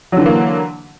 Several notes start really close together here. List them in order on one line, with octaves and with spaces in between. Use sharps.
F#3 D3 E3 A#3